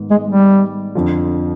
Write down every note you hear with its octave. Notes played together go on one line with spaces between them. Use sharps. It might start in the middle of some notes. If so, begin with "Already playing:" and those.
Already playing: G#2 D#3 B3
G#3
G3
F2 D3 F3